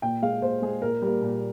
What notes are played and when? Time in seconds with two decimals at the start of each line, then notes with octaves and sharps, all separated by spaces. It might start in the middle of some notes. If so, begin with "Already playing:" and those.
0.02 A#2 G5
0.22 G#3 F5
0.42 A#2 C5
0.62 G#3 G#4
0.82 A#2 A#4
1.02 G3 A#3
1.22 A#2